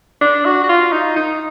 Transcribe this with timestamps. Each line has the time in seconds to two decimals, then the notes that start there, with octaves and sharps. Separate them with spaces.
0.21 D4
0.45 F#4
0.64 F#4
0.69 F4
0.92 D#4
1.16 D#4